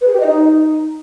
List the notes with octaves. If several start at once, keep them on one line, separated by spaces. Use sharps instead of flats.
B4
G#4
G4
D#5
D#4